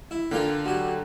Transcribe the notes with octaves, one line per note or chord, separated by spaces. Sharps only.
E4
D3 A#3 F4 F5 G5
F#3 G4